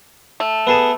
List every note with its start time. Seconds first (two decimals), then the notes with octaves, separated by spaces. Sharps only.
0.40 A3
0.67 B3 G#4 A4